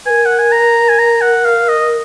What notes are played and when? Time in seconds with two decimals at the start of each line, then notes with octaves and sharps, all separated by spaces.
0.06 A#4 B4 G#5
0.26 F#5
0.39 G#5
0.52 A#5
0.88 G#5
0.99 A#5
1.21 F#5
1.45 F5
1.68 D#5